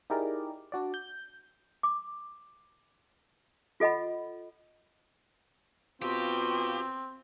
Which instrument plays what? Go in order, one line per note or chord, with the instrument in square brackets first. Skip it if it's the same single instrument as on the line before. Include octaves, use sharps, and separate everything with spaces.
[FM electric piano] D#4 E4 G4 G#4 A#4 D5
D4 F#4 D5
G6
[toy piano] D6
F4 A4 D#5 F#5 B5
[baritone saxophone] B2 [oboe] C4 [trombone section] F4 [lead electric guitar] G4